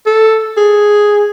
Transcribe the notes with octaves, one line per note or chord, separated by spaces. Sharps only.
A4
G#4